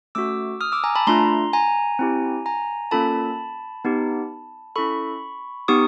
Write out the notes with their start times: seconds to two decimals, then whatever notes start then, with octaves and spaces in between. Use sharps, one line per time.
0.15 A3 C#4 F#4 D6 E6
0.61 D#6 F6
0.72 D6 E6
0.84 G#5 A#5
0.96 A5 B5
1.07 A3 D4 F4 A#5 C6
1.53 G#5 A#5
1.99 C4 E4 G4
2.46 G#5 A#5
2.91 A#3 C#4 F4 A4 A5 B5
3.85 B3 D#4 G4
4.76 C#4 E4 A4 B5 C#6
5.68 B3 D#4 G4 C#6 D#6